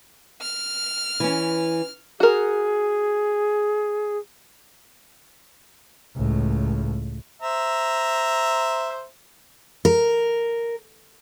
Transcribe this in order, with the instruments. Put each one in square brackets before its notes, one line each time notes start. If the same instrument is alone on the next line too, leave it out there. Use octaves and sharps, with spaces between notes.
[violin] F6
[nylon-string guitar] E3 C#4
[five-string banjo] F#4 A#4 [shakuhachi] G#4
[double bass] C#2 A2
[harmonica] C5 E5 A#5
[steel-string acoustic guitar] A#4